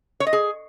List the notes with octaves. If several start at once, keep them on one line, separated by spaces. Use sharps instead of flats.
C#5
D#5
G#4